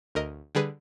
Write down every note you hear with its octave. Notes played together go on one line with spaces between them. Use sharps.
D2 A#4 D#5
D3 G3 G#4 B4